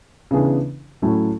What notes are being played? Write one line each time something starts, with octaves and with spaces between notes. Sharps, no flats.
C#3 E3 B3 D4 G#4
A2 F#3 A3 C#4 E4